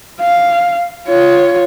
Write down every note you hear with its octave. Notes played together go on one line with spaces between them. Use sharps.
F5
F4 C#5